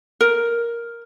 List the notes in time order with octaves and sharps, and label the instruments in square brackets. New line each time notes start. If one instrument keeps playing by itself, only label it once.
[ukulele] A#4